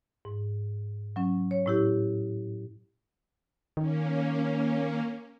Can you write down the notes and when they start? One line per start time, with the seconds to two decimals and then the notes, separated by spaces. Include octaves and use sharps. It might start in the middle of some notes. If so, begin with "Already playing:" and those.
0.25 G#2
1.16 F#3 C#4
1.51 C#5
1.66 A2 E4 G4
3.77 D#3 A#3 C#4